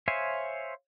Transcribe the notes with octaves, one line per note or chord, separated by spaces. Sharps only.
C5 C#5 E5 F5 G#5